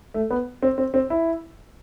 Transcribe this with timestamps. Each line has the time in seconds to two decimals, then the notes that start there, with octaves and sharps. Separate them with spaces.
0.14 A3
0.31 B3
0.63 C4
0.78 C4
0.94 C4
1.10 E4